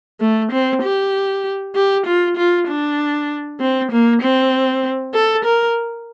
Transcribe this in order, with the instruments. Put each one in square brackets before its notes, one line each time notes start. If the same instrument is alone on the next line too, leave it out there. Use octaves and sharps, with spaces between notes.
[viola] A3
C4
G4
G4
F4
F4
D4
C4
A#3
C4
A4
A#4